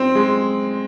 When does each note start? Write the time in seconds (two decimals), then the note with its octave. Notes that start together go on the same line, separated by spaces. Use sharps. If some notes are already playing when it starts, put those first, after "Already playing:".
Already playing: C4
0.15 G#3